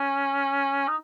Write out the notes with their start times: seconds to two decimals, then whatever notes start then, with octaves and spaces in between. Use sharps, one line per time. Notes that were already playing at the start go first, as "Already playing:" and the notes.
Already playing: C#4
0.88 D#4